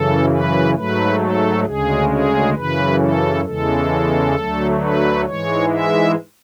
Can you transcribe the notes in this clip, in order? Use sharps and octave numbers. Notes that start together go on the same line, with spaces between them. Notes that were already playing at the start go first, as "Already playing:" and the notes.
Already playing: F#2 C#3 E3 A4
B4
G#2 F#3 A3 B4
A4
D2 C#3 G#3 G#4
G#4
F#2 C#3 E3 B4
A4
E2 C#3 E3 G#3 A4
D2 D3 F#3 A3
B4
G#2 E3 G#3 C#5
E5